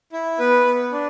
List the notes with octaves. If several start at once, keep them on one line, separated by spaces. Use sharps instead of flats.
E4
B3 B4
B3
D4